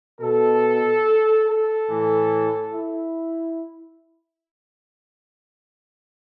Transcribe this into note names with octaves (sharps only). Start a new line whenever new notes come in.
B2 A4
A4
A2 E3
E4